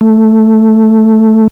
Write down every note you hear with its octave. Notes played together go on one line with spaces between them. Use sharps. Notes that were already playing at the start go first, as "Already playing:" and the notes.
A3